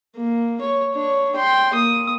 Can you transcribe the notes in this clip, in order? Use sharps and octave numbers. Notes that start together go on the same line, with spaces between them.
A#3
C#5
D4 C#5
G5 C6
A#3 D#6